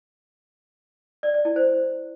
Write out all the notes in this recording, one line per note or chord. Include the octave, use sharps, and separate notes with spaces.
D5
D5
E4
C5